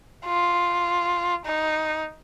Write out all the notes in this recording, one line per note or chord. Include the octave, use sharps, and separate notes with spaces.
F4
D#4